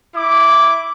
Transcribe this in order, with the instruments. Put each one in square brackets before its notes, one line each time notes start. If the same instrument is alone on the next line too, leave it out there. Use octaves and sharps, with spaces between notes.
[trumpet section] E4 D6